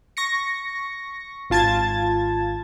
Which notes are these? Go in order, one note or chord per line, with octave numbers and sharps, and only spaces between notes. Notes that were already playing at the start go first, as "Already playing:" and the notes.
C#6 A#6 C#7
G#1 F4 A5 G#6 A6